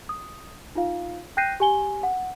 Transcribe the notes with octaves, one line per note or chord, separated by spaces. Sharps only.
D#6
D#4 F4 F5
G5 F#6 G6 A#6 C7 D#7
G4 G#5 G7
F#5